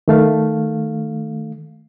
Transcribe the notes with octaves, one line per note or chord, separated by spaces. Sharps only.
D#3 A3 F5